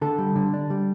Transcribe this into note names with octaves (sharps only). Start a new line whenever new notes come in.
D3 A4
G3
D3
D4
G3